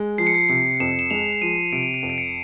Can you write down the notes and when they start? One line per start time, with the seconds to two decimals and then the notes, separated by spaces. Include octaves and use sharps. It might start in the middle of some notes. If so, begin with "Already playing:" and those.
Already playing: G#3
0.18 F3 C7
0.27 C#7
0.34 C7
0.49 C3 C7
0.80 F2 E7
0.99 E7
1.10 G#3 F7
1.33 E7
1.41 F3 D#7
1.72 C3 D7
1.83 D#7
1.94 D7
2.02 F2
2.10 D7
2.18 C#7